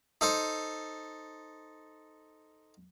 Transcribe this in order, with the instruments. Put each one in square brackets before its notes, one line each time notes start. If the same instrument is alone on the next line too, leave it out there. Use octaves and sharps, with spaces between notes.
[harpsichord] D#4 A4 C5